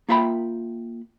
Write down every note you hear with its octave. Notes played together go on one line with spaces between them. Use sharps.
A#3 F4 E5 G5 B5